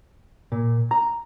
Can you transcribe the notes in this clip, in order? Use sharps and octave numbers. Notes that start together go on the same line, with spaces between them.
A#2
A#5